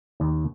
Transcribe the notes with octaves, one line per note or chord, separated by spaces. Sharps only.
D#2